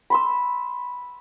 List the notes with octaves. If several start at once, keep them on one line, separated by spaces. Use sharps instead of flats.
B5 C6 E6